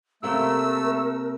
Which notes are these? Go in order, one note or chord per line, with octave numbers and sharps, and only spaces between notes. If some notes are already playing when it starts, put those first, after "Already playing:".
C3 A3 A#3 A#4 E6